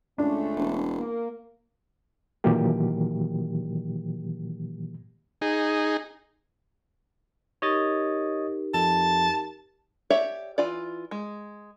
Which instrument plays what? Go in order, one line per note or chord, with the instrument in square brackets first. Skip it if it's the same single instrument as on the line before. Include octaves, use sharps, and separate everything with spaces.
[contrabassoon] C#2 [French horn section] A3 C#4 [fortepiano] D4
[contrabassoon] E1
[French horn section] A#3
[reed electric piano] A#2 D#3 E3 F#3 A#3 G4
[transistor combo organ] D#4 G#4
[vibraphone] D#4 G4 A#4 [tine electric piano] C#5 D#5 A6
[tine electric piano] F2 [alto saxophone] A5
[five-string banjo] G4 C#5 D5 E5
E3 F4 D5
G#3